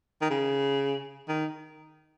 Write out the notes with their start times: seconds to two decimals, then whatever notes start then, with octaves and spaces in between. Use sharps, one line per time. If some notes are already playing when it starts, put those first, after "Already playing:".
0.21 D#3
0.30 C#3
1.28 D#3